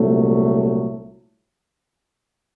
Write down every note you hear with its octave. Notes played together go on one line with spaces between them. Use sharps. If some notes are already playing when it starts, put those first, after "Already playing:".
Already playing: C2 A#2 F#3 A3